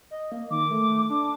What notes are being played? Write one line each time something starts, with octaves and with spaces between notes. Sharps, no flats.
D#5
A#3
D#3 D6
A3
D4 D6